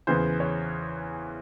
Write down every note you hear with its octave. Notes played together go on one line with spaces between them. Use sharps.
E2 C#3 E3 C5
C#5